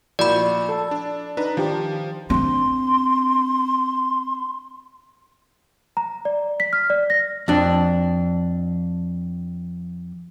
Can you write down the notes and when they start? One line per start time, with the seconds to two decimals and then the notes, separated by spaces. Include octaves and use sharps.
0.19 A#2 F3 E4 F#4 D5 B5
0.69 A4
0.91 D4
1.37 D4 D#4 B4 A#5
1.57 D#3 F3 D4 G4
2.30 C4 D4 C6
5.97 A#5
6.25 D5
6.60 B6
6.73 F6
6.90 D5
7.10 A#6
7.48 F2 D4